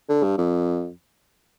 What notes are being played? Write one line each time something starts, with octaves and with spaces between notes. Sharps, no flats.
D3
G2
F2